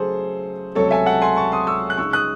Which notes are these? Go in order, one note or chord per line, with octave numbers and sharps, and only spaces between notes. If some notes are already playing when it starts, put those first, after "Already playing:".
Already playing: C#3 F#3 A3 G#4 A4 C5
C#2 C3 F#3 A3 A4 C#5
E5 G#5
F#5 A5
G#5 C6
A5 C#6
C6 D#6
C#6 E6
F#6
C#3 G#3 D#4 C#6 E6
D#6 F#6